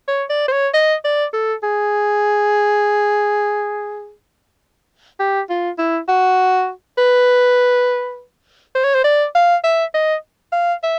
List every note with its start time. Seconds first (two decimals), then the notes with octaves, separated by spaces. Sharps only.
0.08 C#5
0.30 D5
0.48 C5
0.53 C#5
0.74 D#5
1.05 D5
1.33 A4
1.63 G#4
5.20 G4
5.50 F4
5.78 E4
6.08 F#4
6.98 B4
8.76 C5
8.84 C#5
8.95 C5
9.04 D5
9.35 F5
9.64 E5
9.94 D#5
10.53 F5
10.83 E5